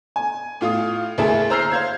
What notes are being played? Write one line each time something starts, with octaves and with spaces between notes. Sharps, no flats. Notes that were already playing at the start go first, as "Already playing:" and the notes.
G#5
A2 F4 F5 D#6
D2 A#3 E4 G#4 E5 A5
C5 A#5 E6 F6 G6 C7
C5 F5 G#6